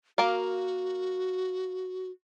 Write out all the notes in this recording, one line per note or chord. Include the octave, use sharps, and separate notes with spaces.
A#3 F#4 A#4 F5